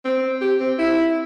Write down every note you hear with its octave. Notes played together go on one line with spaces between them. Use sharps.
C4
G4
C4
E4